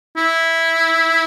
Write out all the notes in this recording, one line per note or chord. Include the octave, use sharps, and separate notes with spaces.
E4